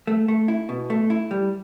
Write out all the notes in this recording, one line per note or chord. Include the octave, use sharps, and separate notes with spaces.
A3
A3
E4
B2
A3
E4
G3